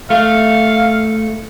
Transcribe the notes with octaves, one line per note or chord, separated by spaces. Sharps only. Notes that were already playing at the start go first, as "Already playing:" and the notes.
A3 F5